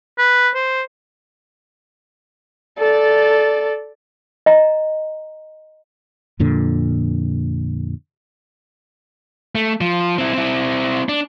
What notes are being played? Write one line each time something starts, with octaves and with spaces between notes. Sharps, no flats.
B4
C5
A4 D5
D#5 A#5
F2 A#2 D3
A3
F3
C4 E4
C4 E4
D4